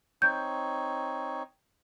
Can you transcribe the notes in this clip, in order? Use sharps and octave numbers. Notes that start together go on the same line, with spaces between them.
C4 D#4 C#5 G6